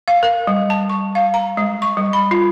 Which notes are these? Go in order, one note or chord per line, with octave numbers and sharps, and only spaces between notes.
F5
A#4
G3
A5
C#6
F5
A#5
G#3
C#6
G3
B5
F4